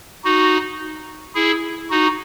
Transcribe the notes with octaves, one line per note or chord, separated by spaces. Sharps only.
D#4 F#4
E4 G#4
D#4 F#4